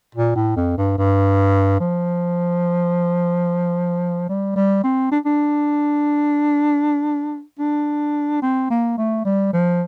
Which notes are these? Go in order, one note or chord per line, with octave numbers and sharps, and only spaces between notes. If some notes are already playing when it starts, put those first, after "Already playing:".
A#2
A2
F2
G2
G2
F3
G3
G3
C4
D4
D4
D4
C4
A#3
A3
G3
F3